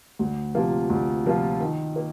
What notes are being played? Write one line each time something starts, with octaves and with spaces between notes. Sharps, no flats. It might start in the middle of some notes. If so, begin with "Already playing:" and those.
D2
C3 F3 A#3 F4
D2
C3 F3 A#3 F4
D#3
A#3